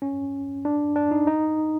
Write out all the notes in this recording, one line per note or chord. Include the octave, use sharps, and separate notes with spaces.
C#4
D4
D4
D#4
D#4